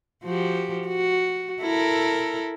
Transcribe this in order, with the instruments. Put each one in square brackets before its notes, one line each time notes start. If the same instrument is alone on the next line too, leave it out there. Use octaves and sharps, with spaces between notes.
[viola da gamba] F3 F#4 G4
F#4
E4 A4 A#4